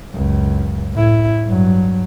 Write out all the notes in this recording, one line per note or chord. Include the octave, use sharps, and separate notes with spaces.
C#2 F#2
A2 E4
G2 F#3